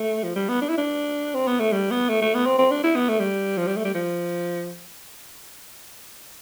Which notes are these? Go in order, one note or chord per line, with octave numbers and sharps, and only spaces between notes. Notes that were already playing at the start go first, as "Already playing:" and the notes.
Already playing: A3
F3
G3
B3
D4
E4
D4
C4
B3
A3
G3
B3
A3
A3
B3
C4
C4
D4
E4
B3
A3
G3
F3
G3
A3
G3
F3